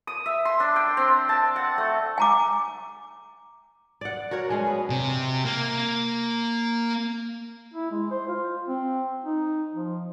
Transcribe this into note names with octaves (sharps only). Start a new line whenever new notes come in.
D#6
E5
C6
D4
G5
C4
A5
F#5
A3
G#5 A#5 D6
D5 F#5
F#4 A#4 C#5 F#5
G#3 C#4 D4
B3
C3
A#3
E4
G#3
C5
F4
C4
D#4
F3